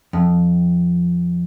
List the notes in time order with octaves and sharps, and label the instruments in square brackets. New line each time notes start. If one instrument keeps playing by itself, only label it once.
[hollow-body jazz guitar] F2